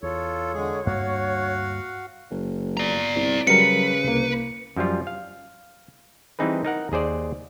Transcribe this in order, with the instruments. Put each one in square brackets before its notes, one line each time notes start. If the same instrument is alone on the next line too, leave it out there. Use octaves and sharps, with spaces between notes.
[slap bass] E2 [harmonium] F4 A4 [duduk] C#5
[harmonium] D3 G#3 G#4
[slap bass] D2 G2 A#3 [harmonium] F#4 F5 F#5
[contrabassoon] F#1
[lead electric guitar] D5 A#5
[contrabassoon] C2
[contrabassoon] C#3 [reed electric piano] F#3 G3 A#4 [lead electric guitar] B4 [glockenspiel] C#7
[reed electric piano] C2 A#3
[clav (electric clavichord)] F#2 F3 G3 F4
F5
E3 G3 C4 D#4 G#4 B4
D#4 A#4 F#5
D#2 G#4 C5 D5